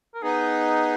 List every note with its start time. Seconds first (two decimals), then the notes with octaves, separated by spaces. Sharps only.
0.15 A#4
0.23 B3 D#4 G#4